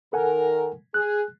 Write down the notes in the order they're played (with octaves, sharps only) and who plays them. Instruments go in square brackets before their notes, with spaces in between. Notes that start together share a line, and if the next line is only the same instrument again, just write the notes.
[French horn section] D#3 A#4 [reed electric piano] A4 F#5 G#5
[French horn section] G#4 [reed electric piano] F#6